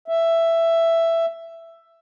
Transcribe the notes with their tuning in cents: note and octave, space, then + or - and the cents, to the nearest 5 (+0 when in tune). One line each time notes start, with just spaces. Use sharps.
E5 +10